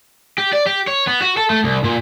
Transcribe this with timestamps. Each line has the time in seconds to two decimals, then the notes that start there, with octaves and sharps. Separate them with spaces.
0.38 G4
0.53 D5
0.67 G4
0.87 C#5
1.07 B3
1.22 F#4
1.37 A4
1.50 A3
1.64 C2
1.84 A#2